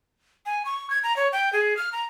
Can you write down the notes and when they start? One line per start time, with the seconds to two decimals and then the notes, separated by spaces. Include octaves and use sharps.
0.46 G#5
0.65 C#6
0.90 G#6
1.03 A#5
1.17 C#5
1.33 G5
1.53 G#4
1.77 F6
1.93 A#5